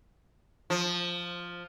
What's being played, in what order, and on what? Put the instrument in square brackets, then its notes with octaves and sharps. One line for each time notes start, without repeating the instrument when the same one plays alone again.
[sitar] F3